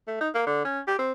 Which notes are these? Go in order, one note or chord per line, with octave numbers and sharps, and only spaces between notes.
A3
D#4
A#3
D3
C#4
G4
C4